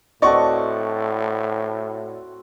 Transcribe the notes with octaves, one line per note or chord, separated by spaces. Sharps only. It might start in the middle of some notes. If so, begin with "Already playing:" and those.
A2 C4 F#4 A4 D5 D#5 C#6